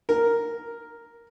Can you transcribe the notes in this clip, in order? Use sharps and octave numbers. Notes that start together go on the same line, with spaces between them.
A#4